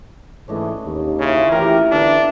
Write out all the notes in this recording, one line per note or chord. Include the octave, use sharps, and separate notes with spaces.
G#2 E3 A3 C#4 D4 D#5
D#2
C#3 E3 F4
A2 E3 G4 A#4
D3 B3 D4 E5